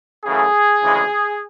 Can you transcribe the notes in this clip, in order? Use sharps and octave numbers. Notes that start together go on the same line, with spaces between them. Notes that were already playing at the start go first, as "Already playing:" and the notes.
F#2 C#3 E3 A3 G#4
D2 C#3 E3 G#3